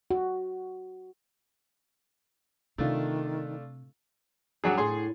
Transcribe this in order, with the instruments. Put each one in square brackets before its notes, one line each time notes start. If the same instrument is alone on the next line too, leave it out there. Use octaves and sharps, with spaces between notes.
[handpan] F#4
[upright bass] C3 [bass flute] D#3 [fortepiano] A3 D4 F4
[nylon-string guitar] G2 C#5 F#5 [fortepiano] F#3 D4 G#4
[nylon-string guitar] A2 [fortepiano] G#4 C6